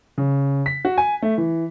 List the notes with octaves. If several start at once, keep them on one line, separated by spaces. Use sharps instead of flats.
C#3
B6
F#4
G#5
A3
E3